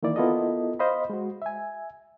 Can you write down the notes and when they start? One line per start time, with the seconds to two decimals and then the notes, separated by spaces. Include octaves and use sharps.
0.03 D#3 E3 A#3 E4 D5
0.16 B3 E4 F4 A4 A#4 D#5
0.79 C5 D#5 F5 B5
1.10 G#3 F#4
1.42 E5 G#5